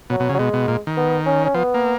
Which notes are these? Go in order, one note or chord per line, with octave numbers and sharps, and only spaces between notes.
B2 F#3
B2
C#3
F#3
B2 G#3
B2
A#2
D#3
B3
C#4
C#4
F3 B3
A#3